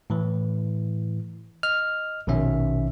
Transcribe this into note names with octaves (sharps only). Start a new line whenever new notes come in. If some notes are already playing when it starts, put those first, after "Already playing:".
A2 E3
D#5 F6
A#1 B2 D#3 C#4 E5